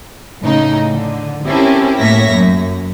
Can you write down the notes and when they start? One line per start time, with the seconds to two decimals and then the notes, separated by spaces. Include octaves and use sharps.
0.42 A2 C#3 D#4
0.93 D3
1.47 C4 C#4 E4 G4 A4 A#4
2.00 A2 A#3 C#5 E5 A#6 B6
2.33 F#2